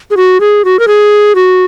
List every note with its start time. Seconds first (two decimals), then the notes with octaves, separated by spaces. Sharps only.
0.11 G#4
0.17 F#4
0.40 G#4
0.65 F#4
0.79 A#4
0.88 G#4
1.35 F#4